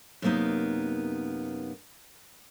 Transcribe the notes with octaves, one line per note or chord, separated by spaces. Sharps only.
F#2 C3 A#3 B3 D#4